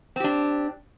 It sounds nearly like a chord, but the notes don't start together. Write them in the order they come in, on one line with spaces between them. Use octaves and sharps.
C4 G4 D4